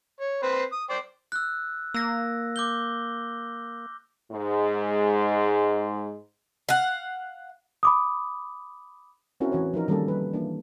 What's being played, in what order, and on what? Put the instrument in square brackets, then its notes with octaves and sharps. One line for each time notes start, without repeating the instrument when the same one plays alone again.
[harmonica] C#5
C4 B4 C5
D#6
C5 D5 G5
[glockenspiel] E6 F#6
[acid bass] A#3 [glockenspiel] E6 A#6
[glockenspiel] D6 G6 G7
[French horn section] G#2 G#3
[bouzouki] F5 F#5
[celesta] B5 D6 D#6
[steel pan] C4 C#4 E4 F#4 A#4
E3 F#4 C#5
F3 D#4 A#4
D#3 G3 A#3 C#4 A4
B4
E3 A#3 D4